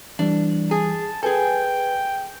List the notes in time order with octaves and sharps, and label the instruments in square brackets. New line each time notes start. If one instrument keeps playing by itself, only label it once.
[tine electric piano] E3 G3 [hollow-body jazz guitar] D4
[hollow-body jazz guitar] G#4 [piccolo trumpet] A5
[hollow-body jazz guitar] G#4 A4 [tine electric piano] B4 G#5 [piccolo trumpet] G5